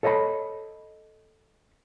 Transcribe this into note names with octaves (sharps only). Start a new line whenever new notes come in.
A4 C#5 D#5 F5 B5